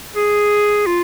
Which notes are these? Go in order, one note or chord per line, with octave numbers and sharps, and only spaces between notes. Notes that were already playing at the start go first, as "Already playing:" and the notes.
G#4
F4